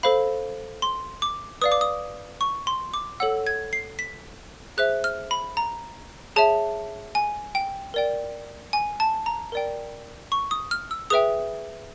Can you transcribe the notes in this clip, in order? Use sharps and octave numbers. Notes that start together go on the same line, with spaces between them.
A4 C5 F5 B5
C6
D6
B4 D5 F5 D#6
D6
D#6
C#6
C6
D6
A4 C#5 F#5 E6
G#6
C7
B6
G#4 C5 E5 F#6
F6
B5
A#5
G#4 C#5 E5 A5
G#5
G5
A#4 D5 G5
G#5
A5
A#5
A#4 D5 G5
C#6
D#6
F6
E6
G#4 B4 E5 G5 D#6